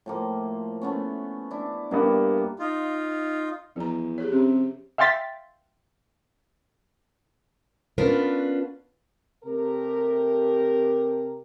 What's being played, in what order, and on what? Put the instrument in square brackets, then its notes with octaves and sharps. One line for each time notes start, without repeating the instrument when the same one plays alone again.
[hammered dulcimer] A2 F3 A#3
A3 B3 C#4
D4 E4
[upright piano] G2 A#3 B3 [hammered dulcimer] G3 D4
[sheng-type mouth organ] D#4 F4
[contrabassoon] E2 [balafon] F3 A#5
[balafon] G4 G#4 C#5
[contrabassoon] C3 [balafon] C#4 G4
[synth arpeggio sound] E5 F5 G5 C6 A6 B6
[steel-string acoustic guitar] B3 C#4 D4 F4 A#4 B4
[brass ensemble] C3 A3 G4 A#4